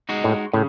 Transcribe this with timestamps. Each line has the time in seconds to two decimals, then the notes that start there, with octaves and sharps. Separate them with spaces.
0.09 G#3 D#4 F#4
0.24 A2
0.53 A2 C#3